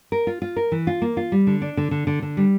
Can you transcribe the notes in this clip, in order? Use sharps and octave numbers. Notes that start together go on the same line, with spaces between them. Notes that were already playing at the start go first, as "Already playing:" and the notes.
A#4
F4
F4
A#4
E3
F4
A#3
F4
G3
D3
D4
D3
D3
D3
D3
G3